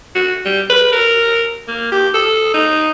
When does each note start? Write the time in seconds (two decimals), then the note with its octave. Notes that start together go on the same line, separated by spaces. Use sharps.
0.15 F#4
0.46 G3
0.70 B4
0.93 A#4
1.68 A#3
1.92 G4
2.14 A4
2.54 D#4